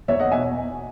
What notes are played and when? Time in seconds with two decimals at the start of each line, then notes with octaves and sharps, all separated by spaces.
0.08 E2 C#5 E5
0.19 D#5 F#5
0.31 B2 E5 G#5